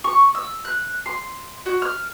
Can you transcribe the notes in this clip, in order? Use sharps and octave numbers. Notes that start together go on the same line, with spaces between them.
C#6
E6
F#6
C6
F#4
F6